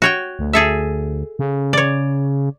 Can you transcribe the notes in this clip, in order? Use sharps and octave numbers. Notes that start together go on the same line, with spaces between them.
F#4 C#5 G5
D2
G#4 A4 E5
C#3
C#5 D5